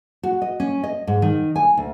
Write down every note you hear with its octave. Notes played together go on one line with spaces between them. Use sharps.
F#4
D#5
C#4
D#5
G#2
D#3
G#5
D2